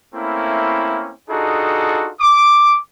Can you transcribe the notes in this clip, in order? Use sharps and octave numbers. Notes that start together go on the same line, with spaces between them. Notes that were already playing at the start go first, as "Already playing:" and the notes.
A3 A#3 C4 C#4 E4
D4 D#4 F4 F#4 G#4 A4
D6